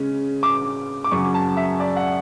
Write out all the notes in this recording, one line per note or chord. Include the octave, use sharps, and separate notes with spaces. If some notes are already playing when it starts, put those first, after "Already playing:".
Already playing: C#3 G#3 C#4
D6
D6
F#2 C#3 F#3 C#4 C#6
A5
E5
D5
F#5